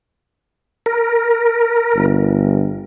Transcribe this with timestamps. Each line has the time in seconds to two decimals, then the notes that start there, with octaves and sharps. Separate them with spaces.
0.86 A#4
1.96 G1